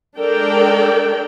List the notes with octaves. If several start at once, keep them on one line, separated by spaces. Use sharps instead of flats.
G#3 D4 A4 A#4 D5 G5